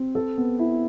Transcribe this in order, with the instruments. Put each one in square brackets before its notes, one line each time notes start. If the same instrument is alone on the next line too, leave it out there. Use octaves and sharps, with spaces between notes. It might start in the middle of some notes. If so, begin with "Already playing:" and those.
Already playing: [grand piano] C4
A4
B3
E4